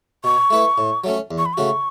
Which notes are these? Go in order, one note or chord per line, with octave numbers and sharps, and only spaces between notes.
B2 C#6
A3 E4 B4
A2
F#3 A3 C#4
E2
C#6
B5
C#3 A3 F#4 C#6